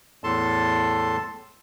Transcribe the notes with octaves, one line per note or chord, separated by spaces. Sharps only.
E2 A2 A4 A5 C6